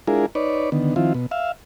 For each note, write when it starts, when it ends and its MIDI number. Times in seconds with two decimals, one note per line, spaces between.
0.07 0.26 56
0.07 0.26 62
0.07 0.26 64
0.07 0.26 65
0.07 0.26 68
0.07 0.26 70
0.35 0.70 63
0.35 0.70 71
0.35 0.70 73
0.35 0.70 74
0.72 0.94 50
0.72 0.94 51
0.72 0.94 59
0.96 1.13 51
0.96 1.13 53
0.96 1.13 60
0.96 1.13 64
0.96 1.13 65
1.14 1.26 47
1.31 1.52 76
1.31 1.52 77